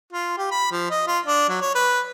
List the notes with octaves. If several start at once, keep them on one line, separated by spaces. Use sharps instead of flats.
F4
G4
B5
F3
D#5
F4
D4
F#3
C#5
B4